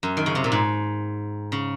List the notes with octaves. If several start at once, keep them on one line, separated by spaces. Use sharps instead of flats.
F#2
D#3
C#3
C3
A#2
G#2
C#3